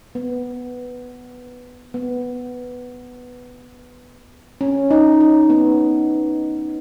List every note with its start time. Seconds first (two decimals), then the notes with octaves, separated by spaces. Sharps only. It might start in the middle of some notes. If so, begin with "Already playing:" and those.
0.15 B3
1.94 B3
4.61 C#4
4.91 D#4
5.20 D#4
5.50 B3